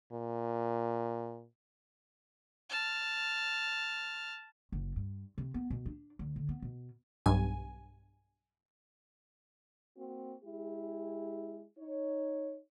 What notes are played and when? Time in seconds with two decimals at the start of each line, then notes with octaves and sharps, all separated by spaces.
0.12 A#2
2.69 A5 F6
4.72 F#1
4.96 G2
5.38 C3
5.54 B3
5.70 B2
5.86 D4
6.19 D2
6.36 D3
6.49 B3
6.62 B2
7.26 B1 G2 G#5
9.97 A#3 C4 F#4
10.43 G#3 E4 G4 G#4
11.78 D#4 C#5